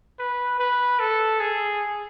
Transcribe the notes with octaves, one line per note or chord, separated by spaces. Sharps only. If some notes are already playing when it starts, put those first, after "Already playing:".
B4
B4
A4
G#4